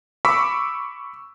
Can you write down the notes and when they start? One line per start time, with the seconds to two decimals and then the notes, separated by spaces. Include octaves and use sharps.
0.25 B5 C#6 D6 E6 B6